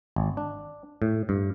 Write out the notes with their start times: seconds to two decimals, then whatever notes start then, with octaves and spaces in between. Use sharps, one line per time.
0.16 G#1
0.37 D4
1.02 A2
1.29 G2